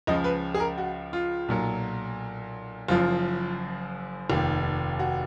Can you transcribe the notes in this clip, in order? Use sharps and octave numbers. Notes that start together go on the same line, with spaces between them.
C#2 C#3 F3 D#5
B4
G#4
A#4
F#4
F4
B1 A#2 F#3
F#1 F#2 F3 F4
F1 D#2 D#3
F#4